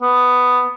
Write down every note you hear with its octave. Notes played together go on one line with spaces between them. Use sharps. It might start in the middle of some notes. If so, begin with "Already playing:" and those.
B3